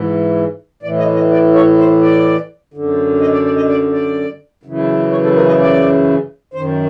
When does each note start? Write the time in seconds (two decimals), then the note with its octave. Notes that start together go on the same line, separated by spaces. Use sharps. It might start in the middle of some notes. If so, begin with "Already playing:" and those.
Already playing: G#2 E3
0.83 A2 E3 D5
0.98 D#5
1.15 D#5
1.31 D5
1.54 C#5
1.78 C5
2.01 D5
2.74 F#2 D3
3.21 D#5
3.33 D5
3.45 D5
3.56 D#5
3.69 D5
3.93 D5
4.63 F#2 C#3 E3
5.11 C#5
5.24 A4
5.36 A#4
5.47 D#5
5.59 D5
6.54 F#2 D#3 C5